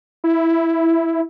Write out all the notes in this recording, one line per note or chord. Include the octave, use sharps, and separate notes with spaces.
E4